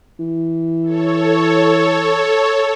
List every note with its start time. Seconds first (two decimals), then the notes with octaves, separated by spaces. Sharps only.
0.19 E3
0.83 A4 C#5